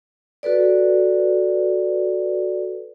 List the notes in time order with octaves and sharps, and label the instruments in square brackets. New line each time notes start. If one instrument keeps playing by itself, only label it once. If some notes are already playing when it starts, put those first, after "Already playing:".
[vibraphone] F#4 A4 B4 D5